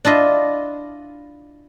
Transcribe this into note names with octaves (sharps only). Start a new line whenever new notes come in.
D4 E4 F4 D#5